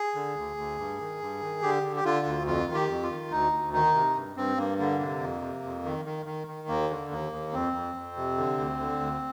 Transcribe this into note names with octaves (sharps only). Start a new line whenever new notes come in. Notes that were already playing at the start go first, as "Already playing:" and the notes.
Already playing: G#4
D3
D2
D2
G2
D#3
G2
D#3
D3 G4
D3
G4
D3 F4
D2
F2 F4
D#3
G4
F2
F4
D#3
D2 D#4
D2
D#3 D#4
C3
G2
G2 C4
G2 A#3
D3 A#3
C3
F2
C3
F2
D#3
D#3
D#3
D#3
D#2 A#3
D3
D#2 A#3
D#2
F2 C4
F2
F2
C3
D3
D2
D3
D2